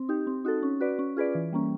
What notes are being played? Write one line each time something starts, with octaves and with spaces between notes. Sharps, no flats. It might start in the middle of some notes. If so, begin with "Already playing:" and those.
Already playing: C4
D#4 G4
C4
D#4 F#4 A4
C#4
F#4 B4 D5
C#4
F4 G#4 B4 D5
E3
G3 A#3 C#4